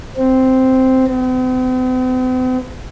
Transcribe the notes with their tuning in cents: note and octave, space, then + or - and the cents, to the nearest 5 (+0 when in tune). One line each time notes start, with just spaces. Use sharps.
C4 -5
C4 -45